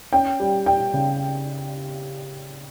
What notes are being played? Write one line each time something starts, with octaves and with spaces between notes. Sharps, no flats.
C#4 G5
G3
G3 G5
C#3